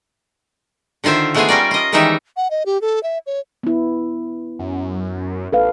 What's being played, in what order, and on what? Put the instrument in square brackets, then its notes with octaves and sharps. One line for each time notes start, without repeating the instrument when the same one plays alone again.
[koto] D3 D#3 F4 C5 E5
G#3 A3 B3 F4 G#4 G#5
G3 C#4 A#4 D5
F4 D#5
D#3 E3 G3 G#3 D#4 E5
[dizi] F#5
D#5
G4
A4
E5
C#5
[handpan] B3 E4
[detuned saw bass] F#2
[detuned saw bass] A1 [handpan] A4 B4 F5